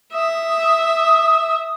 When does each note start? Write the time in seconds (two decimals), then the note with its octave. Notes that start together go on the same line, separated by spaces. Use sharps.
0.13 E5 D#6